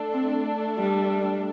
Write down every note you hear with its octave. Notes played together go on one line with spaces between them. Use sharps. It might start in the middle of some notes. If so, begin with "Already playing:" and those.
Already playing: A3 D4 A4
C4
G3